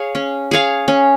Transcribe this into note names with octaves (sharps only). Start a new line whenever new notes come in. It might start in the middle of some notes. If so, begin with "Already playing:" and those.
Already playing: G#4 C#5 F5
C#4
G#4 C#5 F5
C#4